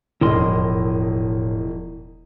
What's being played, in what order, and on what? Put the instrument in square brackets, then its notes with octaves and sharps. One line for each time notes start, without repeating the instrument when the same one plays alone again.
[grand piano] E1 F2 D#5 [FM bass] A2 [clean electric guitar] E4 A#4 C6